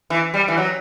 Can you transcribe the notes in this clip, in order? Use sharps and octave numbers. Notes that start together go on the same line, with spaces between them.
E3
G3
E3
F#3